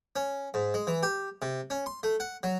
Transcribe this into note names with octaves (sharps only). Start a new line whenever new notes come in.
C#4
G#2
G#3
E3
G4
C3
C#4
C6
A3
F#5
F#3